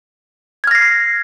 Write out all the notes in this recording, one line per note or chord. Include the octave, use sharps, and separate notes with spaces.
F6 G#6 A#6 C7